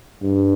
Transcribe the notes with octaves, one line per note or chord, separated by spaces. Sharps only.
G2